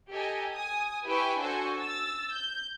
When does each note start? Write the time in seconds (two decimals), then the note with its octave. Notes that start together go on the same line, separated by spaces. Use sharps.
0.10 G4 A4 D#5 G#5 A#5
0.53 G#5 D#6
1.05 E4 G4 B4 G5 G#5 C#6
1.40 D4 F#4 A4 C5 G#5 C#6
1.79 E6 A6
2.33 G6